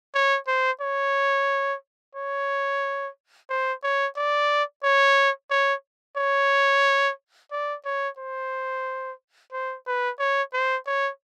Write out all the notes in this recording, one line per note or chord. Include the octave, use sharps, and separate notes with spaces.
C#5
C5
C#5
C#5
C5
C#5
D5
C#5
C#5
C#5
D5
C#5
C5
C5
B4
C#5
C5
C#5